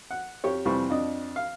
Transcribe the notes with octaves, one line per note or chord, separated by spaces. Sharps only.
F#5
F2 G4 C#5
F2 C3 E3 G3 C5 C#6
F2 D4 D#5
F5